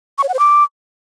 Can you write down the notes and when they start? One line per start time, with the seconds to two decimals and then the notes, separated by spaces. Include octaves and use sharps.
0.18 C#6
0.23 C#5
0.29 F#5
0.34 C5
0.39 D6